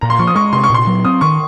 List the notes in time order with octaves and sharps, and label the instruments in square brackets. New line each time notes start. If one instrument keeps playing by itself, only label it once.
[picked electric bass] A#2 [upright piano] A#5
[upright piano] C6
[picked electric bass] F3 [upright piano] C#6
[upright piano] D#6
[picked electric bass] G#3 [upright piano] C#6
[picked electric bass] C3 [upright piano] C6
[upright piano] C#6
[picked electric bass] A#2 [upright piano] C6
[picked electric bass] F#3
[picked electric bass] C4 [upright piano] D#6
[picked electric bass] D#3 [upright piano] C#6